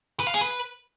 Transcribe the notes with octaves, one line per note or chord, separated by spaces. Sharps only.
B4
F5
G#4
B4